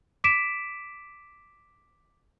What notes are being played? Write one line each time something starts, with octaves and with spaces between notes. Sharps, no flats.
D6 B6 D7 E7